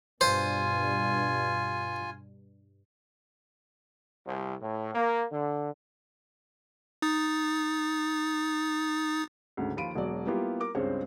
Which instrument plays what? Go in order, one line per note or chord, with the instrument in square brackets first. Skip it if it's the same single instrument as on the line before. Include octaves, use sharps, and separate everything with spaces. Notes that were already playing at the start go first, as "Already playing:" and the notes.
[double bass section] G2 B2 [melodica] F4 G#5 [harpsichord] C5
[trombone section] C2
A2
A#3
D3
[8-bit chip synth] D#4 D#6 A6
[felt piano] D2 G#2 C#3
D#2 F3 F4 B5 D7 D#7
E1 F#3 D5
G3 A#3 B3 E4 F4 G4
A#4 D6
C#2 G2 G#3 C4 C5 C#5